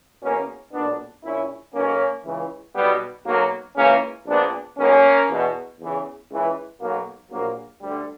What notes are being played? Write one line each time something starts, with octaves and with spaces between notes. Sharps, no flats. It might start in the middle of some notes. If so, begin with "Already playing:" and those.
E2 B2 A#3 C#4
B1 A#2 B3 D4
A#1 A#2 C#4 E4
B1 B2 A#3 C#4
C#2 C#3 E3
B1 B2 G3 B3
B1 B2 F#3 A#3
C#2 C#3 E3 A#3 C#4
A#1 A#2 B3 D4
B1 B2 A#3 C#4
E2 B2
E2 C#3 E3
C#2 C#3 E3
B1 B2 F#3 A#3
A#1 A#2 F#3 A#3
D2 D3 G3